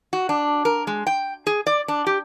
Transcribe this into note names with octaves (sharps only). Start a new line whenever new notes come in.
F#4
D4
A#4
G#3
G5
G#4
D5
D4
G4